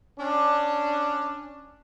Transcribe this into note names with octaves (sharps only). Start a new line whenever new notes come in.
C#4 D4